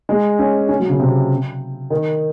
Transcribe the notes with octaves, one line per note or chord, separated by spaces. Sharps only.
G#3
C#4
C#4
F#3
C#3
C3
D#3